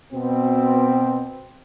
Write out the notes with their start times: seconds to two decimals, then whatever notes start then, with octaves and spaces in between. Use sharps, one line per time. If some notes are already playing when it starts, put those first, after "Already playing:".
0.13 B2 C4